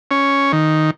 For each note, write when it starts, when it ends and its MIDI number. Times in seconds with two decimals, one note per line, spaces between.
0.11 0.52 61
0.53 0.90 51